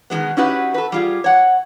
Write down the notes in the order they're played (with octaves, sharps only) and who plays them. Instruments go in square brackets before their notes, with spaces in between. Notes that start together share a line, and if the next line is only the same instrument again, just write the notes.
[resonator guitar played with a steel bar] B2 D#3 F3 G#3 B3
C#4 D#4 E4 F#4 G4 B4
A4 B4
G3 F4 G#4
C#5 F#5